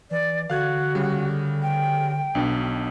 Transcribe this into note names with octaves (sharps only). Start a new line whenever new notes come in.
E3 D5
D3 F#4 F5 F#6 G#6
C#3 G3
G5
B1 B2 D4